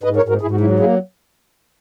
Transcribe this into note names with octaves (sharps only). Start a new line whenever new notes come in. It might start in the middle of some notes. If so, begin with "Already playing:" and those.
G#2 B4 D#5
A#4 C#5
G#2
F#4 A#4
G#2 E4 G#4
F#4
F#3 E4
F#4
A#3 E4 G#4